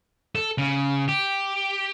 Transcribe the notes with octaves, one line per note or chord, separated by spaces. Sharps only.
A4
C#3
G4